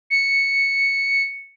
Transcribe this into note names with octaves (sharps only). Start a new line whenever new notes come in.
C#7